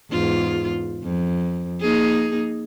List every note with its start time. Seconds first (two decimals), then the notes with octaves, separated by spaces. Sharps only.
0.11 E2 G#2 F4
1.03 F2
1.81 A#3 D#4 G#4